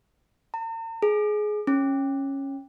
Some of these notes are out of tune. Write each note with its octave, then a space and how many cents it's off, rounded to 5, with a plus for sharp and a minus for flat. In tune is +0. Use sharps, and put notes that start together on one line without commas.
A#5 -45
G#4 +20
C#4 -10